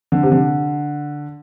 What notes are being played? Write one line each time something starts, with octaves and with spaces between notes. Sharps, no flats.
D3
C3
D3